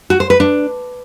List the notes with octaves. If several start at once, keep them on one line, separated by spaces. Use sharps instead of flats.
F#4
C5
B4
D4